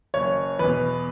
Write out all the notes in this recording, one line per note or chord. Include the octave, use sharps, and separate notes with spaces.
F#1 C#5
E2 B2 B4